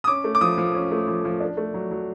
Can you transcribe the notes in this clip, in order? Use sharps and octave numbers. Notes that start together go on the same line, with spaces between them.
D#6
C#4 D6
A3
D6
F3 D#6
F3
C#4
A3
F3
F3
D4
A3
F#3
F#3